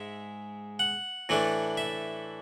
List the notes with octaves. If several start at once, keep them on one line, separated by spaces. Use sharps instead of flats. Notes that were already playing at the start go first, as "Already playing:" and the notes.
Already playing: G#2 G#3 E5
F#5
A2 E3 A3 D4
E5